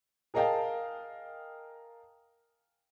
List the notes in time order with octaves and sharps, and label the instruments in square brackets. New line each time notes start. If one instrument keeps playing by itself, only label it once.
[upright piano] G#4 A#4 D#5 F5 G5 A5